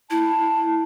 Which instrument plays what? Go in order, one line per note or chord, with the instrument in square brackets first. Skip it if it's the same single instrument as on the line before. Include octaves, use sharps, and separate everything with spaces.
[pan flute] E4 [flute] A5